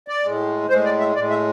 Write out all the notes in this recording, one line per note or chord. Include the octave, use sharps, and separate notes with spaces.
D5
A2 G#3
A2 G#3 C5
D5
E5
A2 G#3 D5
E5